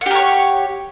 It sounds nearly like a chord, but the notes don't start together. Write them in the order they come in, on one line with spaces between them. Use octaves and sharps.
F#5 G4 A#4 C#5